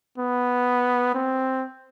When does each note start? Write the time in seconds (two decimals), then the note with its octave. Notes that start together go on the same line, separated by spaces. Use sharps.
0.18 B3
1.14 C4